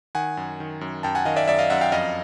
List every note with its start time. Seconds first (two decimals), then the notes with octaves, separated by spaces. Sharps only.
0.15 D#3 F#5 G#5
0.37 F#2
0.60 D#3
0.81 F#2
1.03 F#2 G5 A5
1.15 F#5 G#5
1.25 D#3 D#5 F5
1.36 D5 E5
1.48 F#2 D5 E5
1.59 D#5 F5
1.70 F#2 E5 F#5
1.81 F5 G5
1.92 F2 D#5 F5